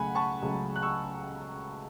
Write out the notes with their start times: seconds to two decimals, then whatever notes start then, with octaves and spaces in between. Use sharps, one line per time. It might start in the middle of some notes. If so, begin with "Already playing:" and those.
Already playing: C#2 C#3 F#3 A3 F#5 G#5 B5
0.15 A5 C#6
0.42 C#2 C#3 F#3 A3
0.76 F#6
0.82 C#6 E6